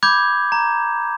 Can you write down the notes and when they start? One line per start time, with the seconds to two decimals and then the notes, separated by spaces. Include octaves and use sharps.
0.03 B5 D6 G6 G#6
0.52 A#5